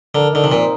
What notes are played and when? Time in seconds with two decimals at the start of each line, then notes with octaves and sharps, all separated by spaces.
0.15 D3 A#4
0.33 D3 D#4
0.44 C3
0.52 A#2 C4